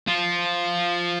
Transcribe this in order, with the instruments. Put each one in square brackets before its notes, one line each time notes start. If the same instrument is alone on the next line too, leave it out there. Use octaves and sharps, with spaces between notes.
[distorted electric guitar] F3 F4